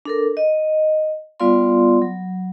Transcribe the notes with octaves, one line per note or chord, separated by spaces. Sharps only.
D4 A4 A#4
D#5
G3 B3 F4 D5 F5 C6
F#3